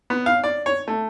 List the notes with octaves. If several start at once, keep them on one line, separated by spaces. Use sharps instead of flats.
B3
F5
D5
C#5
A3